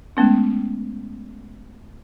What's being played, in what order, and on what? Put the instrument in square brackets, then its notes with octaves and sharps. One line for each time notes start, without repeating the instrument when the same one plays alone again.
[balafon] G#3 A3 B3 C#4